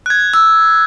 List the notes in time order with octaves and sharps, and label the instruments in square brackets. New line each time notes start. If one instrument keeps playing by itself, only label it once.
[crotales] F#6 G#6
[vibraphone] E6